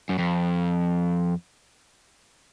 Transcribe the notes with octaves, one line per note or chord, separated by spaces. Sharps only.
F#2
F2